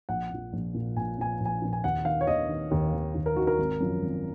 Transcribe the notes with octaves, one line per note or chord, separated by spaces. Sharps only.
A#1 F#5
A#2 F3
A#1
A#2 F3
A#1 G#5
A#2 F3 G#5
A#1
G#5
A#2 F3
G#5
D#2 F#5
D#3 F5
C#5
D#2 D#5
D#3
D#2
D#3
D#2
A#4
D#3 F#4
A#4
G#1
F#2 F3
G#1